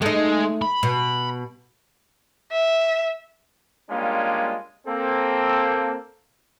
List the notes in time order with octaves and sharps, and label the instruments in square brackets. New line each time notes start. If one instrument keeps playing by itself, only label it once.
[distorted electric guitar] G#3 [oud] A3 D#4
[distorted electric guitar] B5
[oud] B2
[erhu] E5
[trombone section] G3 G#3 A#3 C#4 D4 F4
A#3 C4 A4